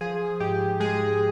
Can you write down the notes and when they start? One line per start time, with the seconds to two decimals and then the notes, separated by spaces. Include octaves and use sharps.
0.01 F3 G#4
0.40 G#2 G4
0.80 G#3 G#4